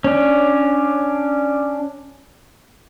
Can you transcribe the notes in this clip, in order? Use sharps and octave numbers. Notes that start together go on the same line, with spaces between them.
C#4 D4